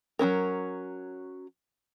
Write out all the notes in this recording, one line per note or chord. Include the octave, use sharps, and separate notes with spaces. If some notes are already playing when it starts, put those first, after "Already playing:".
F#3 G3 C#4 A#4